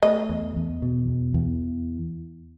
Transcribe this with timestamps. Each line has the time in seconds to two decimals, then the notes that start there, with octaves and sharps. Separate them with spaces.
0.03 A3 D#5
0.29 E2
0.56 E2
0.82 B2
1.08 E2
1.34 E2